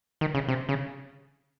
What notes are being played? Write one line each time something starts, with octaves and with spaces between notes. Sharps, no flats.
D#3
C#3
C3
C#3